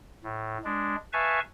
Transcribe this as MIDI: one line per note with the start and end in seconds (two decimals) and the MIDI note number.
0.24 0.58 45
0.65 0.96 56
0.65 0.96 62
1.13 1.40 71
1.13 1.40 76
1.13 1.40 77
1.13 1.40 80
1.13 1.40 81
1.13 1.40 85